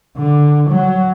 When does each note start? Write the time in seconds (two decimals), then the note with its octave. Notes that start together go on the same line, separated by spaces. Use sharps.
0.17 D3
0.69 F#3